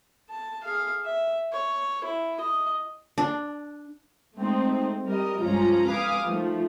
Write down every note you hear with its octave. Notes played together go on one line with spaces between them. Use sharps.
A5
G#4 F5
E5
C#5
E4
D#5
D4
G#3 A3 C4 D#4
G3 A#4 D#5
C#2 G2 F3 C#4 F4 A#5
B4 F5 G#5 D6 D#6 F6
D#3 F3 A3